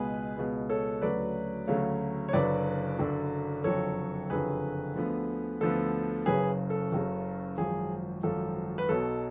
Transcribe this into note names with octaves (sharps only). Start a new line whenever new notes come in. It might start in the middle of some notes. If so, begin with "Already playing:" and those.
Already playing: C#2 B2 G#3 B3 G#4 B4
C#2 B2 G#3 B3
A4 C#5
D2 C#3 F#3 A3 B4 D5
D2 C#3 F#3 A3 C#5 F5
C#5
F#1 F#2 D3 F#3 B4 D5
F#1 F#2 D3 F#3
F#1 F2 D3 F#3 A4 C#5
F#1 F2 D3 F#3 G#4 B4
D2 D3 F3 B3
D2 D3 F3 B3 A4
F#1 F#2 C#3 G#4 B4
A4
F#1 F#2 C#3
G#1 F#2 F3 G#4
G#1 F#2 F3 A4
B4
B1 B2 F#3 A4